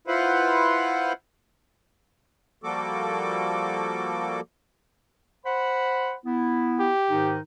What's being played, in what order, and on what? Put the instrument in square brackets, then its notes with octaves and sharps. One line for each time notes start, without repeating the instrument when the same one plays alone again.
[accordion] E4 F4 B4 C5 F#5
F3 G3 A#3 F#4 A4 D6
[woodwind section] C5 F#5 B5
B3 E4
[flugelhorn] G4
[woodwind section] G#2 D#3 D#4